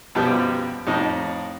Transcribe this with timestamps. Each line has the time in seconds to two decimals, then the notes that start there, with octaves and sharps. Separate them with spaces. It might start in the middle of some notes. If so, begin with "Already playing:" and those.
0.15 B1 F#2 F3 G3 B3 G5
0.87 F2 A2 D#4